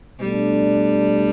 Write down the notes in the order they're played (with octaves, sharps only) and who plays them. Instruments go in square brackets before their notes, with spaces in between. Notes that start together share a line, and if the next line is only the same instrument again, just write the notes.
[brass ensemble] B2 A3 D4 [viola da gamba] G3